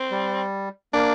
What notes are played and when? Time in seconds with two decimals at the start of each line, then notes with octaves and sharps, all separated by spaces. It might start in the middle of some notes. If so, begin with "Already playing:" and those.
Already playing: C4
0.11 G3
0.93 A#3 D4